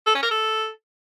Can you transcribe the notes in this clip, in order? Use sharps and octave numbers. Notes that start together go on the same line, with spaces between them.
A4
C#4
A#4
A4